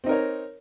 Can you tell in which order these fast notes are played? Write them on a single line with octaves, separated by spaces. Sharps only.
C4 D#4 A#4 C#5